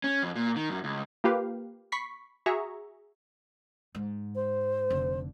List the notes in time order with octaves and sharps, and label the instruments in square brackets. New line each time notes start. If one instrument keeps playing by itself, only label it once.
[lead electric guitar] C#4
F2
A#2
D#3
F#2
C#2
[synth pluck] A#3 F4 G4 B4 F5
B5 C#6 B6 C7
F#4 G#4 E5 A#5 C#6
[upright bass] G#2
[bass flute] C5
[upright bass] F1 D3